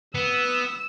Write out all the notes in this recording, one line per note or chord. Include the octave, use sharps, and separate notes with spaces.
B3 E6